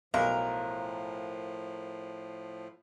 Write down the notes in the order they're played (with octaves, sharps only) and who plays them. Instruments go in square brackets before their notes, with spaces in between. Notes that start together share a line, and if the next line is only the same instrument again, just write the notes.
[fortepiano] B1 [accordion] A2 F3 [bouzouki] A#4 [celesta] F5